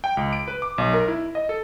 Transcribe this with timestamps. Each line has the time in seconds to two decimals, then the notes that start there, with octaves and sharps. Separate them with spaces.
0.04 G5
0.17 C#2
0.33 D7
0.48 B4
0.62 D6
0.78 B1
0.93 A#4
1.08 E4
1.35 D#5
1.49 A4